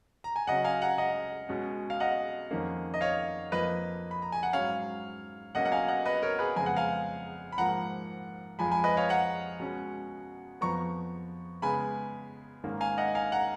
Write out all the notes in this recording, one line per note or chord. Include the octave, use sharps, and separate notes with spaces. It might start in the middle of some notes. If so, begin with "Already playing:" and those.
A#5
G#5
C#3 F#3 C#4 D#5 F#5
F5 G#5
F#5 A#5
D#5 F#5
B2 G#3 C#4
F5
D#5 F#5
F2 D#3 A#3 C#4
D#5
C#5 F5
F2 F3 A#3 B4 D#5
B5
A#5
G#5
F#5
G#2 F#3 C#4 C#5 F5
B2 F#3 A#3 C#4 D#5 F#5
F#5
F5 G#5
D#5 F#5
B4 D#5
A#4 C#5
G#4 B4
F2 C#3 G#3 B3 G#5
F#5
F5 G#5
B5
G#2 F3 A#3 F#5 A#5
F2 F3 G#3 G#5 B5
G#5 B5
B4 D#5
C#5 F5
F#5 A#5
B2 G#3 C#4
F2 F3 B3 A#5 C#6
C#3 G#3 B3 G#5 B5
G#2 D#3 A#3 C#4
F5 G#5
D#5 F#5
F5 G#5
F#5 A#5